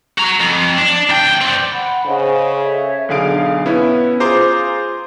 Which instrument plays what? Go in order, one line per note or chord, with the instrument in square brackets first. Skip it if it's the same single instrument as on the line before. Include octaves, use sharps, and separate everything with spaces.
[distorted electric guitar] F#4 A#5
F2
D4
D2 G5
C4 D4
[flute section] F#5 B5
[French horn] C#3 [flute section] C5 D#5
[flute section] A4 C#5 E5
[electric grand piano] B1 D3 G#4 F5 D7
B3 C#4 E4
F4 G#4 C5 A#5 C6 D6